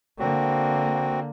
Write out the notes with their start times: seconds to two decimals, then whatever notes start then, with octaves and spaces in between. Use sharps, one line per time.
0.19 D3 A#3 C4 F#4